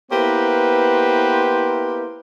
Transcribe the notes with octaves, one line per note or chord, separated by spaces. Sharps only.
A#3 B3 E4 G4 B4 C5